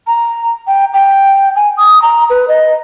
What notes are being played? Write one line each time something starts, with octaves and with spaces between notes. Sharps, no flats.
A#5
G5
G5
G#5
D#6
A#5
B4
D#5